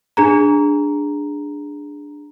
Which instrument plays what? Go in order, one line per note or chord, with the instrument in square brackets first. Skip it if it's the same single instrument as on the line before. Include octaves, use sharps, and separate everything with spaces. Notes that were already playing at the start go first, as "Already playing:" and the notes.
[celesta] D4 G#4 A#5